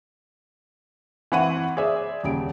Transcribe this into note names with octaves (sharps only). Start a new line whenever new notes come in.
E3 C4 F#5 C#6 D#7
G#4 C5 D5 E5
D#1 C#3 D7